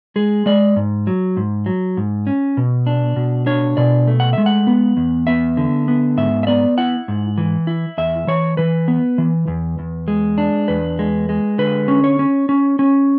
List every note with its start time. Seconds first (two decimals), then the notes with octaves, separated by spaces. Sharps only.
0.16 G#3 G#4
0.46 G#3 D5
0.76 G#2
1.07 F#3
1.37 G#2
1.66 F#3
1.97 G#2
2.27 C#4
2.57 B2
2.87 D4
3.16 B2
3.46 D4 C#5
3.77 B2 D5
4.07 A3
4.20 F#5
4.33 G#3 E5
4.46 F#5
4.67 B3
4.97 E2
5.27 B3 E5
5.57 D3
5.88 B3
6.17 G#2 E5
6.43 E5
6.47 B3 D5
6.78 E4 F#5
7.08 G#2
7.38 E3
7.67 E4
7.98 E2 E5
8.27 E3 C#5
8.57 E3 B4
8.88 B3
9.18 E3
9.48 E2
9.79 E2
10.08 G#3
10.38 D4
10.68 E2 B4
10.99 G#3
11.29 G#3
11.58 D3 B4
11.88 C#4
12.04 C#5
12.19 C#4
12.49 C#4
12.79 C#4